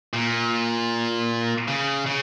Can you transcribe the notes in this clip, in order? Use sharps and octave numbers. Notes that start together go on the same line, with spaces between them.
A#2
C#3
C#3